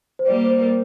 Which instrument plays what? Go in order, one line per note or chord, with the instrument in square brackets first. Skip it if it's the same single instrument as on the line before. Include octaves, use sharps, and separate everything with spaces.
[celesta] C5
[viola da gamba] G3 A#3 [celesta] D5
[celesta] C5
A#4